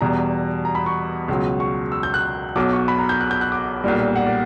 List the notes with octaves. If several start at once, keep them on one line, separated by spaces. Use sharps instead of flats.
E2 B2 G3 A#5
A#5
B5
C#6
C#2 B2 F#3
C#6
E6
G6
F#6
B1 B2 F#3 D6
C#6
B5
A#5
G6
F#6
G6
F#6
D6
B1 A#2 G3
F#5
D5